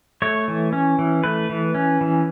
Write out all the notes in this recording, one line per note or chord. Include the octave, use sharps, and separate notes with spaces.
A3 C#5
E3
C#4
E3
A3 B4
E3
C#4
E3